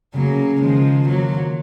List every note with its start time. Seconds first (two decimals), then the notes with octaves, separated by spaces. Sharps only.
0.14 C#3 F#3 A#3
0.61 D#3 F3 G#3
1.08 F3 F#3 A#3
1.32 F3